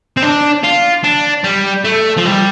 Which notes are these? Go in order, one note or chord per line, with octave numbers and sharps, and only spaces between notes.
C4
D4
F4
D4
G3
A3
F3
G3